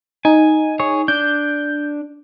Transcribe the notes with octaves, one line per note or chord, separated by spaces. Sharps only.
D#4 G#5
G#4 C#5
D4 G6